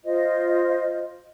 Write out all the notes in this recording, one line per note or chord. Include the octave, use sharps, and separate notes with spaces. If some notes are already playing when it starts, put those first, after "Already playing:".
F4 C5 D#5